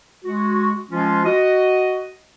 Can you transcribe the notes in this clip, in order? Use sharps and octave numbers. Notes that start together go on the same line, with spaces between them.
G#3 F#4
F3 G#3 C#4 F4
F#4 D#5